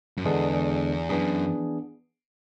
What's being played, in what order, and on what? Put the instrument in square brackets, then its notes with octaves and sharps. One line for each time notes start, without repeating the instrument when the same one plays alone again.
[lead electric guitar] F#2
[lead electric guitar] E2 [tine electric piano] D3 G#3 B3 D4 G#4
[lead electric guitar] F#2 [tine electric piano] E3 B3 D4 G#4